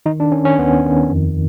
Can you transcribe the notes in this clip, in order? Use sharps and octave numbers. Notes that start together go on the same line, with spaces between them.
D#3 D#4
D4
D#3 C#4
C#4
D#2 B3
D#3
F2